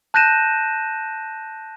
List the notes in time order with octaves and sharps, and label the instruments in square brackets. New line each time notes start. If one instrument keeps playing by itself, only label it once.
[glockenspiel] A5 F#6 G6 A#6 D#7 E7